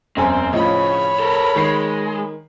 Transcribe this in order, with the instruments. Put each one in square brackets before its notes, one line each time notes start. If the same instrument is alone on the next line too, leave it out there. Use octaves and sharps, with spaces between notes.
[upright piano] E1 F#2 G#5 [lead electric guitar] C4
[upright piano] A2 F3 D#5 [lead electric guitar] C#3 [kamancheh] C#5 B5
[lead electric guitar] A4 A#4
[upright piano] D#3 C7 [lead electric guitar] G#3